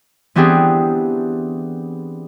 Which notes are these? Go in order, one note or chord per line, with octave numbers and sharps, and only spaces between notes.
E3 B3 C4 D4 G4 G#4